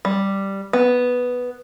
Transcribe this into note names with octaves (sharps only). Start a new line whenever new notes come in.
G3
B3